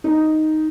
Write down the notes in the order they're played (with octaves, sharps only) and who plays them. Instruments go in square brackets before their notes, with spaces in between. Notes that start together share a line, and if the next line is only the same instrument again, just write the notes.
[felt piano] D#4